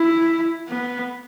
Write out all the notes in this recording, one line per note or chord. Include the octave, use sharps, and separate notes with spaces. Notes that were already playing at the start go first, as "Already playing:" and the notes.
Already playing: E4
B3